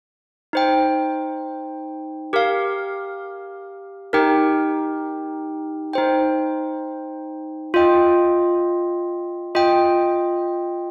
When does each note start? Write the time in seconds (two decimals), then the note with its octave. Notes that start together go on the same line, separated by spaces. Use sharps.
0.53 D#4 C5 G5
2.33 G4 A#4 F5
4.13 D#4 G4 A#4 G5
5.93 D#4 C5 G5
7.74 F4 D#5 G5
9.55 F4 D#5 G5